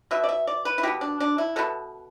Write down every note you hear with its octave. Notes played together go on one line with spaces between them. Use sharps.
B2 B3 E5
D5
E5
D5
B4
E4
B2 B3 G4
D4
D4
E4
B2 B3 A4